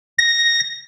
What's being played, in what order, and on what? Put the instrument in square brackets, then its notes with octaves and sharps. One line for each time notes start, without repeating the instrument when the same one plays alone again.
[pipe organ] A#6